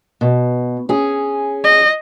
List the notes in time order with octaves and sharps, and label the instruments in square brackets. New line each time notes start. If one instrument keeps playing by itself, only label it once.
[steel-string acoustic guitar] B2
C#4 G#4
[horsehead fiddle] D#5